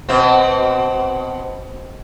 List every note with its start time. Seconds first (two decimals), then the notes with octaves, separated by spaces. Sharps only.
0.09 B2 C4